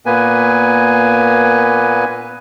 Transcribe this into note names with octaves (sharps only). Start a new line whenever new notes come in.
A#2 A#3 B3 B4 G#5